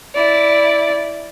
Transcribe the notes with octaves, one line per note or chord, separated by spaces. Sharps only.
E4 D5